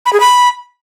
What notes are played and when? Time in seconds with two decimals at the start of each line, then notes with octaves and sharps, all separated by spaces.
0.06 B5
0.13 G#4
0.20 B5